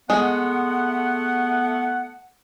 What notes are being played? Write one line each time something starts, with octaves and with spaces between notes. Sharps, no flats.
G#3 A3 B3 F#5